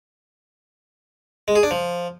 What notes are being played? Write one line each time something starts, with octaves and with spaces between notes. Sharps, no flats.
G#3
G#4
D4
F3